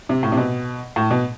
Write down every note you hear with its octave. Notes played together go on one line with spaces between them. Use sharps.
C3
A2
C3
B2
A2
B2